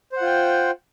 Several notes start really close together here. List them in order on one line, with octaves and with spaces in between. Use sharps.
C5 F#5 F4 G5